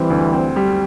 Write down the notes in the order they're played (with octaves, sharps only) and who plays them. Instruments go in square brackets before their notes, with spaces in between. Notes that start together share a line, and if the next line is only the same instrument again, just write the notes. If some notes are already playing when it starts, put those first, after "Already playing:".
Already playing: [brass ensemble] E3 G3 [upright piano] C4
[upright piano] D2
C4
G3